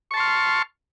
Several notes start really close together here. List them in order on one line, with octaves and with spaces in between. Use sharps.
C#6 A5 C6 F6